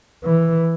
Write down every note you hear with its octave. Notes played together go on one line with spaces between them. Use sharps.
E3